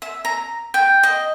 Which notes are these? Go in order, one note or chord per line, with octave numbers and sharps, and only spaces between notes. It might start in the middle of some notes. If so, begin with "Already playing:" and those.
E5
A#5
G5
D#5